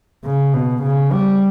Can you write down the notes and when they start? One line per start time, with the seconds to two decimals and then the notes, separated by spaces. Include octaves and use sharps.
0.24 C#3
0.53 B2
0.83 C#3
1.13 G3